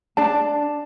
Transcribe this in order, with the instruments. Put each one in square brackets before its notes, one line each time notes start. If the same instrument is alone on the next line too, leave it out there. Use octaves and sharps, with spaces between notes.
[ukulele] D4 D5 A5